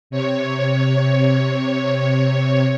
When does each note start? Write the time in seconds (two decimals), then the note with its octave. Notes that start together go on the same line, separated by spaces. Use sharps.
0.10 C3 C#5